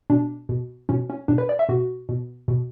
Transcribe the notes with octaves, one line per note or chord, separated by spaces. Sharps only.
B2 D4
B2
B2 C#4
C#4
B2 D4
B4
D5
E5
B2 F#4
B2
B2